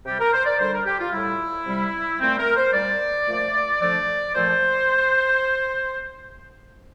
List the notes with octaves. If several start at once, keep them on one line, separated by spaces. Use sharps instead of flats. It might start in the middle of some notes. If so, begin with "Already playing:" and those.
C3 G4
G3
A#4
C5
D5
D3 G3 C5
A#4
G4
F4
A2 G3 E4
C3 G3
A#2 A3 C4
A#4
C5
A#2 G3 D5
A#2 F3 A3
D3 F3 A3 D5
A#2 F3 A3 C5